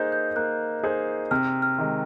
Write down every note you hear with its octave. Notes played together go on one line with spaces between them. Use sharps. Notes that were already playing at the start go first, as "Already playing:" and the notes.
Already playing: A#3 D#4 G#4 C5 F#6 G6
G6
A#3 F#6
D#4 G#4 C5
C3 F6
F6
D#3 G#3